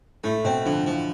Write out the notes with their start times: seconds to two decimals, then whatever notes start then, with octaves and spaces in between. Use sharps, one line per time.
0.24 A2 A3
0.44 B2 C4
0.66 D3 F3
0.87 E3 F3